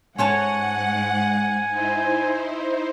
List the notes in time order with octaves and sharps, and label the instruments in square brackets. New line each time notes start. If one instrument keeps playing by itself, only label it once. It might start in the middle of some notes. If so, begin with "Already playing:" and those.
[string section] G#2 F#5 [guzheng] C#4 C#5 A5 [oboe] G#5
[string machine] D#4 E4 C5